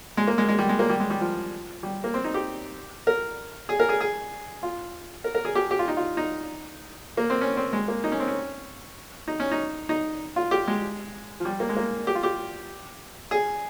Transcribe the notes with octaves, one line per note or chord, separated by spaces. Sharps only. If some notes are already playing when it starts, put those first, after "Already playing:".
G#3
A#3
G#3
G#3
G3
G#3
A#3
G3
G#3
G3
F3
G3
A#3
C4
D#4
G4
A#4
G#4
A#4
G#4
G#4
F4
A#4
A#4
G#4
G4
G4
F4
D#4
F4
D#4
A#3
C4
C#4
C4
G#3
A#3
D#4
C#4
C4
C#4
D#4
C#4
D#4
D#4
F4
G4
G#3
F3
G3
A#3
G#3
A#3
G4
F4
G4
G#4